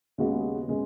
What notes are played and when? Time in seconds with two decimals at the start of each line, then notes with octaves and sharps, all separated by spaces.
0.18 D#2 C#3 G#3 B3 F#4
0.68 C#3 G#3 B3